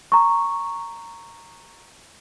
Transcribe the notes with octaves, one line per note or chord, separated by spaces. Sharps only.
A#5 C#6